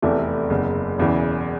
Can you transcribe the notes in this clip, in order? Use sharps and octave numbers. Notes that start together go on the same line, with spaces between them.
F1 E2 C3 E3 A3
F#1 E2 C#3
E1 E2 C#3 E3